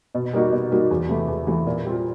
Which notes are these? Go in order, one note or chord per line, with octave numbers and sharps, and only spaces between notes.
B2
G3 A#3 D#4 F#4
B2
G3 A#3 D#4 F#4
E2
C3 E3 A3
E2
C3 E3 A3
A#2
G3 C4 F4